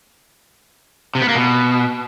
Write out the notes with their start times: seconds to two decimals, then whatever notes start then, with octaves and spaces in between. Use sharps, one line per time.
1.15 C3
1.22 B3
1.29 A#3
1.35 B2